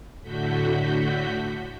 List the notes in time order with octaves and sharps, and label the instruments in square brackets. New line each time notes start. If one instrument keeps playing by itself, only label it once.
[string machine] A2 D3 F#4 G6 B6